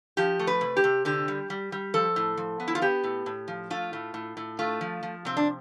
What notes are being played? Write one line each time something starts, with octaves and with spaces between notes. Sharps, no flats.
F3 G4
A3
B4
C3
G4
C3
D3 G4
G3
G3
G3
F3 A4
A2
F3
B3
E4
F4
B3 G4
A2
A2
F3
A3 F4
A2
A2
A2
A3 F4
F3
F3
C3 C4
D4